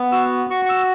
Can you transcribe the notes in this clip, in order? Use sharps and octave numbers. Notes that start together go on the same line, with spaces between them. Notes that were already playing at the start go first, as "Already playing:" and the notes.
Already playing: B3
F#4 E6
F#4 C#6
C#6
E6